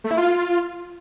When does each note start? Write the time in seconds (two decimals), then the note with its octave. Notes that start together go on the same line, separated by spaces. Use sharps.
0.04 A3
0.11 E4
0.17 F4